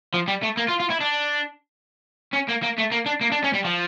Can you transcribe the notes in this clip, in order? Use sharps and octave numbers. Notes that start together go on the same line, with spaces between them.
F3
G3
A3
A#3
F4
F4
E4
D4
C#4
A#3
A#3
A3
A#3
D4
A#3
D4
C#4
G3
F3